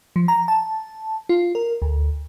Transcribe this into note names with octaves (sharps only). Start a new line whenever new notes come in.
F3
A#5
A5
F4
A#4
D2